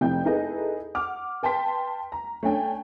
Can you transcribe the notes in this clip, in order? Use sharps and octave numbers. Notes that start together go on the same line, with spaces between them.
F1 F2 E4 G5 G6
D#4 E4 G#4 A4 B4 D#5
F#5 D6 F6
B4 G5 A5 C6 B6
A#5
A3 C#4 D4 G5 G#5